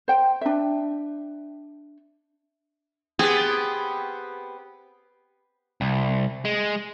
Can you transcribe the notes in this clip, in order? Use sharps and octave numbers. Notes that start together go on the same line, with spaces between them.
C5 G5
D4 E5
B3 C4 G4 G#4
C2
G#3